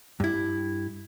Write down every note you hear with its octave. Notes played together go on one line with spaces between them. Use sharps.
G2 E4